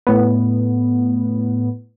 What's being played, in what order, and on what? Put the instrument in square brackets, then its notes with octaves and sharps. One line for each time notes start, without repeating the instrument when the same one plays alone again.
[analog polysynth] A2 B3